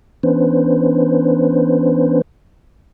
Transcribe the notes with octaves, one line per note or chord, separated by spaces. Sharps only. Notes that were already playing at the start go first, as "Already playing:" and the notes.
E3 B3 C#4 D4 B4 C5